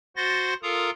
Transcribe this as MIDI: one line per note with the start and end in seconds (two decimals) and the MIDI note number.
0.16 0.54 66
0.16 0.54 72
0.16 0.54 78
0.16 0.54 84
0.16 0.54 93
0.16 0.54 94
0.63 0.90 65
0.63 0.90 69
0.63 0.90 70
0.63 0.90 77
0.63 0.90 82
0.63 0.90 87